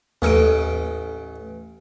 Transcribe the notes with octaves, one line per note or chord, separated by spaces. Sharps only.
A1 D#2 C#4 D#4 A4 D7